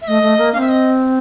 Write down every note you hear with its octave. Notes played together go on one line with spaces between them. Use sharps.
E5
A3 D#5
A3
A#3
D4 F5
C4 E5
D#5